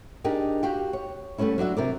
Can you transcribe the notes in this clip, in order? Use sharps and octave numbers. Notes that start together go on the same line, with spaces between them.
D4 D#4 G4 G#4 A#4
F#4 G4 F5 G5
C#5
G3 A3 B3 C#4 E4
F#3 D4 F#4 E5
C3 A#4 D5